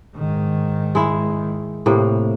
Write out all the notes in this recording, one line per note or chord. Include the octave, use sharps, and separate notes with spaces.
G#2 D#3
G#3 E4
A2 C3 A#3